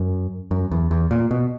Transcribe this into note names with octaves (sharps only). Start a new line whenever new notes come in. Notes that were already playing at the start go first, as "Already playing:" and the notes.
Already playing: F#2
F#2
E2
E2
A#2
B2